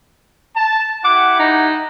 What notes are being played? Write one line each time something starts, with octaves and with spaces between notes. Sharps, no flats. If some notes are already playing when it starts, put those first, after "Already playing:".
A5
E4 G4 F#5 D6
D#4